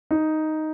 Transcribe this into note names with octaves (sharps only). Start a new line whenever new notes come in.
D#4